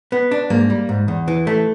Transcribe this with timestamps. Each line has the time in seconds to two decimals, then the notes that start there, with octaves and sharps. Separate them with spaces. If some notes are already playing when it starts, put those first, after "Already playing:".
0.12 B3
0.31 D4
0.50 G#2 A#3
0.70 G3
0.89 G#2
1.08 E2
1.28 E3
1.47 A3